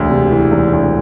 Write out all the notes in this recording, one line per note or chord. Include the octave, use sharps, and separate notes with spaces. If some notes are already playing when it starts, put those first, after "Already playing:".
Already playing: E1 D2
C3
E3
E1
D2